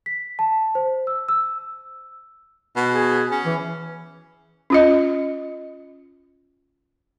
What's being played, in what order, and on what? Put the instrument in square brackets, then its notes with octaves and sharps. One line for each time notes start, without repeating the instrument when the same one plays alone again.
[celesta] B6
A5
C5
E6
E6
[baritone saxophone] B2
[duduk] G#4
[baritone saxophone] C#4
[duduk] E3
[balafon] C#4 F4 D#5